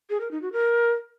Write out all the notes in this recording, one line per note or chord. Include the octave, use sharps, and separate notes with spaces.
G#4
A#4
D#4
F#4
A#4